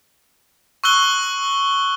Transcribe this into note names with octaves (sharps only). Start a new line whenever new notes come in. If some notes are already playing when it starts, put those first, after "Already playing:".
C#6 E6 F#6 G7